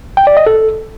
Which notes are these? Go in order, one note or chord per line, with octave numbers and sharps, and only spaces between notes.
G5
D5
D#5
A4